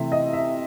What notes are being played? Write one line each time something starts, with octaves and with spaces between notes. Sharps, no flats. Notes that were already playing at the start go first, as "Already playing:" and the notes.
Already playing: C3 E3 A3 E5
D#5
E5